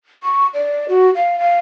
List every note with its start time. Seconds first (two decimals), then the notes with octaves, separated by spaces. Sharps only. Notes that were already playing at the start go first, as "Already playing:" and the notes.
0.23 C#6
0.54 D5
0.89 F#4
1.15 F5
1.39 F5